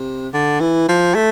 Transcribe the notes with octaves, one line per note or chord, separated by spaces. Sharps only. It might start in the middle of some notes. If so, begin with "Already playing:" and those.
Already playing: C3
D3
E3
F3
A3